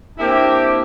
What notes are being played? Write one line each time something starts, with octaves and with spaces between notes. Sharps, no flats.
A#3 C4 D4 E4 G4